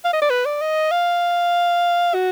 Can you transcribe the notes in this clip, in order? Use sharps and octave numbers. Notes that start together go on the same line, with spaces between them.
F5
D#5
D5
B4
D5
D#5
F5
F#4